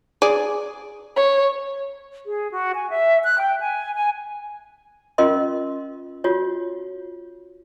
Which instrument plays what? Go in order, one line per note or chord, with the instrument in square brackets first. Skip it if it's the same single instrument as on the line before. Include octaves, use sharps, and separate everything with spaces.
[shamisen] G#4 D5
[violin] C#5
[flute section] G#4
F#4
G#5
E5
F#6
G5
G#5
G#5
[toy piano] C#4 F4 A#4 D#5 C6
F4 F#4 C#5